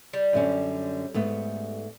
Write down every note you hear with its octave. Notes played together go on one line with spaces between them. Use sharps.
G3
F#2 D3 C#4
G#2 A3 B3